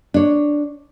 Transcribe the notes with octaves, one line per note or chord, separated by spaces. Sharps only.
D4 C#5